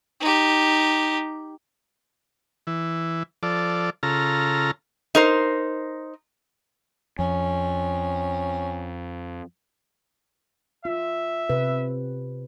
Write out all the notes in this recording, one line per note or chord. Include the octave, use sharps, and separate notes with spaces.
D#4 G4
E3
F3 A4 D5
C#3 F4 A4 A#5
D#4 A#4 C5
F2 C#4
F4 E5
C3 B4